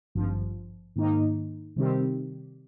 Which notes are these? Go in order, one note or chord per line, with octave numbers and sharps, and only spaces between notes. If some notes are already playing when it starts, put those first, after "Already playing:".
G#1 G2 F3
G#2 D#3 A#3 D#4
C3 D#3 G3 C4 G4